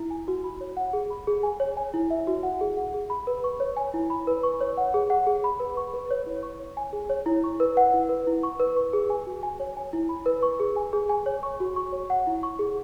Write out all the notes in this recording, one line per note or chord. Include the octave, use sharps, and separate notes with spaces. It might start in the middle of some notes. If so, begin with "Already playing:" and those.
Already playing: E4
G#5
F#4
B5
C#5
F#5
G#4
B5
G#4
G#5
C#5
G#5
E4
E5
F#4
F#5
G#4
F#5
G#4
B5
B4
C#6
C#5
G#5
E4
B5
B4
C#6
C#5
F#5
G#4
F#5
G#4
B5
B4
C#6
B4
C#5
E4
C#6
C#5
G#5
G#4
C#5
E4
C#6
B4
F#5
E4
B4
E4
C#6
B4
C#6
G#4
G#5
F#4
G#5
C#5
G#5
E4
B5
B4
C#6
G#4
G#5
G#4
G#5
C#5
C#6
F#4
C#6
C#5
F#5
E4
C#6
G#4